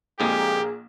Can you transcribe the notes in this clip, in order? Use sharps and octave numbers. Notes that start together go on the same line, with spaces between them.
A#1 F2 G#3 A#3 G4 G#4